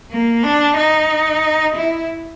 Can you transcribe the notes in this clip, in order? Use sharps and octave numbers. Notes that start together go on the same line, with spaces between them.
A#3
D4
D#4
E4